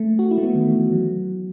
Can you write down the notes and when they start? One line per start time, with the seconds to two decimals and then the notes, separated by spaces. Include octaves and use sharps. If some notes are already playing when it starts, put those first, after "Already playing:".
Already playing: A3
0.19 F#4
0.31 E4
0.38 A3
0.43 B3
0.55 D#3
0.68 E3
0.92 F#3